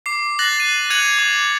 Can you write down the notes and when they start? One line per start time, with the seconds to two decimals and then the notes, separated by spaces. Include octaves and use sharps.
0.06 D6 C7
0.39 F#6 A6 A#6 F#7
0.60 D#7
0.90 F#6 G#6 C#7 D#7 F7 F#7
1.19 D6